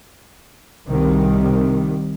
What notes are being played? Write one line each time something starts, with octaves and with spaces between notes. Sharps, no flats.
C2 C3 D#3 G3